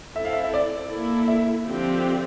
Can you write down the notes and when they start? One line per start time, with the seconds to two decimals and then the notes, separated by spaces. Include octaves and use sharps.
0.16 C4 E4 A4 E5
0.25 F5
0.33 E5
0.44 E5
0.54 D5
0.91 A#3 E4 A4
1.28 E5
1.65 D3 F3 C4 G4